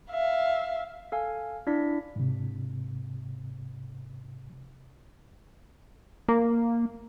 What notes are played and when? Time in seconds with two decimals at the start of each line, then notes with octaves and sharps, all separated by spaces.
0.11 E5 F5
1.12 A4 F5 G#5
1.67 D4 E4 D5 B6
2.16 G#2 C3
6.29 A#3